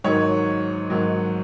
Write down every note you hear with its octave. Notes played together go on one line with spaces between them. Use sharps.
G#2 D#3 F#3 C#5
G#2 D#3 F#3